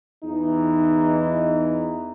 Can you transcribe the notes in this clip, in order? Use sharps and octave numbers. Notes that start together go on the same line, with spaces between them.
E2 E3 D#4